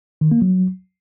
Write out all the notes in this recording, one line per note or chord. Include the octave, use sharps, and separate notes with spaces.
D#3
A#3
F#3